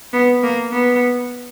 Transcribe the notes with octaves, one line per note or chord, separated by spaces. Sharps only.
B3
A#3
B3